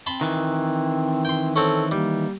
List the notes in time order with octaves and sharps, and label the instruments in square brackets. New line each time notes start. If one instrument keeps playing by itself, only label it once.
[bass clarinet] C4 [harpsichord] A5 B5 C6
[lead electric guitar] D#3 E3
[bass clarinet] C4 [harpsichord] G5 C6
[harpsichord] C4 C#4 [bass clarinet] A4
[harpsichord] G3 [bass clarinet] A#3